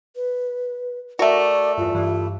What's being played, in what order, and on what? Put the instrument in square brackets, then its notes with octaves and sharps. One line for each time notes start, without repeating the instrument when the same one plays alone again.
[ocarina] B4
[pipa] A3 F#4 [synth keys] A#4 [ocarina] D5
[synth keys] E2 G2 [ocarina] F4
[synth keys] G2 E3